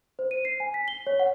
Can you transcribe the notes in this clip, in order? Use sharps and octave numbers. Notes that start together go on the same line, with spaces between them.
C5
D#7
C7
G#5
B6
G7
C#5
F#5